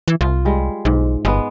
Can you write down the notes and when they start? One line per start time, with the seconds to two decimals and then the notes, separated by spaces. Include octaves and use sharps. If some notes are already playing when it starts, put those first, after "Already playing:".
0.08 E3
0.21 C2 F4
0.45 G3 G#3
0.85 B1 G#2
1.25 G1 G#3 B3